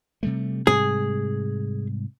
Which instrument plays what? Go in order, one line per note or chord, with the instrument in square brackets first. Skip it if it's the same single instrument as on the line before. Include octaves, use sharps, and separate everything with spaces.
[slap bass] C3 G3 A3
[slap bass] G#2 C3 G3 [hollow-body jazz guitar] G#4